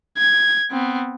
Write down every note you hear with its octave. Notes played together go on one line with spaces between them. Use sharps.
G#6
B3 C4